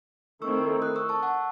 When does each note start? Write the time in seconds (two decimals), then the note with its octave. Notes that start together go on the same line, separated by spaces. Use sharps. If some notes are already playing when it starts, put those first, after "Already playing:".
0.42 D#3 A3 C4 E4 C#6 E6
0.82 D#6 F#6
0.95 C#6 E6
1.09 A5 C#6
1.23 F#5 A5